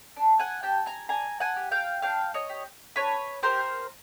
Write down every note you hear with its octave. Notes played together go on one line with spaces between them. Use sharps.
D4
F#5 G#5
G4 G5 A5
G#5 A#5
D4 G#5 A#5
F#5 G#5
G4
F5 G5
D4 F5 G5
C#5 D#5
G4
D4 B4 C#5
G4 A#4 C5